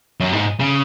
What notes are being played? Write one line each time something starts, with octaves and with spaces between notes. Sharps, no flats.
F#2
G#2
C#3